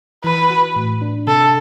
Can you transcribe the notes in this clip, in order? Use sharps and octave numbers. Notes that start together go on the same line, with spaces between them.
E3 B4
F#4
A2
D4
C3 A4